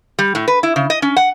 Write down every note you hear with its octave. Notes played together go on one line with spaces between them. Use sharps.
G3
A2
B4
E4
C#3
D#5
C#4
F#5